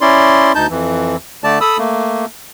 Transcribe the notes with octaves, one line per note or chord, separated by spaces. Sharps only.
C#4 E4 D5 C6
D2 D#4 A5 G6
F2 E3
D3 A3 D5 A5
A4 B5 D#6 E6
A3 A#3